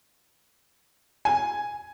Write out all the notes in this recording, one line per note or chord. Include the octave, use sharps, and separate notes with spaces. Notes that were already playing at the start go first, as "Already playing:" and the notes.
G#5